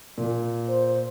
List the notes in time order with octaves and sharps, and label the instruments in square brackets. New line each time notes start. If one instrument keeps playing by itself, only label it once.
[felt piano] A#2
[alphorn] C5